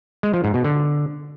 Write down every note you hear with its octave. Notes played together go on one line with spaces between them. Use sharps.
G#3
F3
G#2
B2
D3